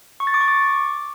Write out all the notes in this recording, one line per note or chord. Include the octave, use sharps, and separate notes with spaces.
C#6
A6
D6
C#6
D6